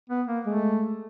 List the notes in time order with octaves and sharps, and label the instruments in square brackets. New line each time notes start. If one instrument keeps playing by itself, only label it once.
[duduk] B3
A#3
[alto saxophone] G#3 [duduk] A3